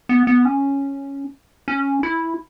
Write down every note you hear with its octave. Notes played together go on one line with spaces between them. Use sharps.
B3
B3
C#4
C#4
E4